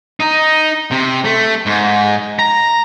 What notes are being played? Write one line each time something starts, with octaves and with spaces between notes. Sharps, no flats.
D#4
C3
A3
G#2
A#5